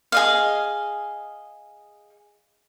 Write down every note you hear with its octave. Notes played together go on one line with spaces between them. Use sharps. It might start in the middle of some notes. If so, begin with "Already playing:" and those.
G#4 D#5 F5